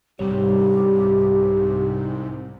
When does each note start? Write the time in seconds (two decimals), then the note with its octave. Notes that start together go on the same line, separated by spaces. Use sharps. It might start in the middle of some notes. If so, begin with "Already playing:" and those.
0.19 C2 G#2 C3 G3 G4 C#5